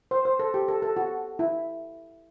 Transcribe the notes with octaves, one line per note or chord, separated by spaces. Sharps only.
C5
C5
A4
G4
A4
A4
F#4
E4